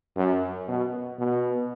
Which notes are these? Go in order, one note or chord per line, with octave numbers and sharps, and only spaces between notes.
F#2
B2
B2